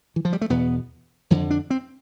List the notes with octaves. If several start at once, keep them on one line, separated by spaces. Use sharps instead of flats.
E3
F3
G3
A3
E2 B2 B3
F2 D3 E3
D4
C4